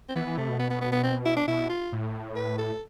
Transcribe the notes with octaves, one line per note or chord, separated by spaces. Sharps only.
C4
E3 B3
E3
C3 A3
B2
B3
B3
B3
B3
C4
E4
D4
B2 E4
F4
A2
B4
A4